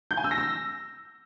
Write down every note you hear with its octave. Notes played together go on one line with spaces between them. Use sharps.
G6
G#5
E6
A#6
E6